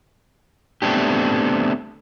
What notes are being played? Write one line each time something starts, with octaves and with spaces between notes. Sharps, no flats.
A3 B3 C4 D4 G4